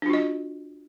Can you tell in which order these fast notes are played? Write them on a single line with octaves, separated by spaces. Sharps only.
D4 F4 F#4 D#5